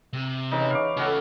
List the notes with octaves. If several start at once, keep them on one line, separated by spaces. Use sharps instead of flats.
C3
C#3 E3 D#4
F5 C#6 D6
C#3 C#4 F4 F#4 A4